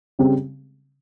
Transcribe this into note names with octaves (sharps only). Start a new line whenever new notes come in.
C#3 G3 C4